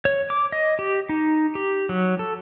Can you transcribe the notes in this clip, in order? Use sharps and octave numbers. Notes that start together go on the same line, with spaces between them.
C#5
D6
D#5
G4
D#4
G4
F#3
A4